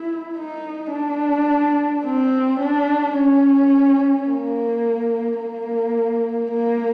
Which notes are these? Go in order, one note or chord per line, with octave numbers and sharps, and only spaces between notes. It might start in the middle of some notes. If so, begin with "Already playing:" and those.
Already playing: E4
D#4
D4
C4
D4
C#4
A#3
A#3
A#3